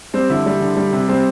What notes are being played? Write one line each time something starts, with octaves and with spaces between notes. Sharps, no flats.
G3 C4
D3 E4
G3
D3
G3
C3
G3 C4